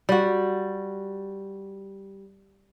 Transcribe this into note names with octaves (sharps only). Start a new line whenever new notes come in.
G3 F#4